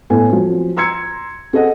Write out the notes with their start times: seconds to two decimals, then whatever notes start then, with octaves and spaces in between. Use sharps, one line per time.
0.10 A2 B3 A4 G#5
0.29 F3 F#3 C4
0.77 A#5 C6 E6 G#6 C#7
1.53 C4 G#4 A4 D#5 F#5